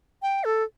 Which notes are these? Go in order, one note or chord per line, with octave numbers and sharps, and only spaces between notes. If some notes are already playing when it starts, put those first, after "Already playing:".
G5
A4